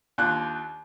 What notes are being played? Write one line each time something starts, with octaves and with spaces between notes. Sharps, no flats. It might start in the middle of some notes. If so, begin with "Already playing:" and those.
D#2 D4 F4 F#6